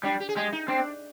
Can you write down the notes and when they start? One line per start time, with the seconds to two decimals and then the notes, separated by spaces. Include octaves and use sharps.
0.03 G3 D4
0.20 G4
0.29 G#4
0.36 G#3 G4
0.52 D#4
0.68 C4 D4